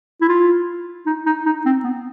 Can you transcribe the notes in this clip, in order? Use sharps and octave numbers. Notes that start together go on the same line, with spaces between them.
E4
F4
D#4
D#4
D#4
C4
B3